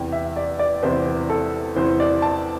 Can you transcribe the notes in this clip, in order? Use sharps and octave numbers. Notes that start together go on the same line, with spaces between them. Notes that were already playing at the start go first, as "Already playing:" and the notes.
Already playing: E2 C3 E3 G5
E5
D5
D5
E2 C3 E3 C5
A4
E2 C3 E3 C5
D5
A5